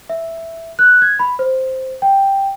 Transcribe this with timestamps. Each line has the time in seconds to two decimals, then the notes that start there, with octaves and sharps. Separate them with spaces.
0.09 E5
0.79 F#6
1.02 G#6
1.19 B5
1.39 C5
2.02 G5